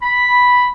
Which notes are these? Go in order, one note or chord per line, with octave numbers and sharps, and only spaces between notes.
B5